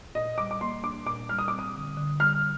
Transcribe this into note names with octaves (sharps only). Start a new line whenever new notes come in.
A#2 D#5
G3 D6
D6
A#3 C6
D4 D6
A#2 D6
G3 F6
D#6
C4 D6
D#6
D3
D3
G3 F6